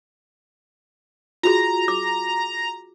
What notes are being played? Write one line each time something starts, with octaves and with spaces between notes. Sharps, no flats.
F4 F#4 G#4 A#5
D6